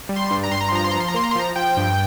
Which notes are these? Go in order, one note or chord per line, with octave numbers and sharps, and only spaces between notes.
G3
C6
G2
A#5
G2 C6
A#5
C6
F3 A#5
C6
F3 A#5
C6
A#5
A#3 C6
A#5
C6
F3 A#5
F3 G5
G2